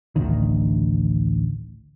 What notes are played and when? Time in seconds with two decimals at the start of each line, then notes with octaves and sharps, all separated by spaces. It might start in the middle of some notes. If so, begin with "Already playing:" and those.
0.16 A1 D2 D#3